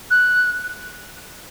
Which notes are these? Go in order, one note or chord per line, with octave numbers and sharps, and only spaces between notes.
F#6